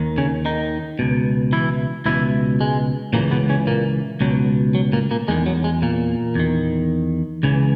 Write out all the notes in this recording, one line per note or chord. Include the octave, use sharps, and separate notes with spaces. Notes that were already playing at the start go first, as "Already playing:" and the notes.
Already playing: D#2 D#3
C#3 C#4
D#3 D#4
C#2 B2
E3 E4
C#2 B2 E3 E4
G#3
C#2 A#2 C#3 E3 A#3
B2 B3
C#3 C#4
A#2 A#3
C#2 B2 F#3
F#3
A#2 A#3
A#2 A#3
E2 D#3 G#3
F#3
G#3
A#2 A#3
E2 D#3
C#2 C#3 E3